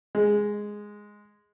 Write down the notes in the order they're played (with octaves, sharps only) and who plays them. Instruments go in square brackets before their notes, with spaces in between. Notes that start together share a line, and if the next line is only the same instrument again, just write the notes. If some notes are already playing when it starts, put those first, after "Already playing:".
[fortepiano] G#3